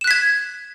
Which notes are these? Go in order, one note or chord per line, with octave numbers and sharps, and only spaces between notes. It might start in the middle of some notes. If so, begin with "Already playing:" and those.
F#6 G#6 B6 E7